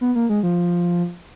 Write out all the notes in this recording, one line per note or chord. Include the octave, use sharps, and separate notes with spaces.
B3
A#3
G#3
F3